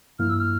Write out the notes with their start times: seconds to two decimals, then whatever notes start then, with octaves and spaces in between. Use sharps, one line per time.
0.19 G2 F3 A#3 E4 F6
0.30 E6
0.40 F6